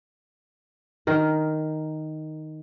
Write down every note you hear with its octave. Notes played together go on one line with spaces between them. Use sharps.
D#3 A#4